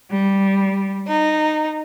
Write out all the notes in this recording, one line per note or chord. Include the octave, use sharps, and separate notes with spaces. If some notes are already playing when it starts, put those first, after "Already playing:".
G3
D#4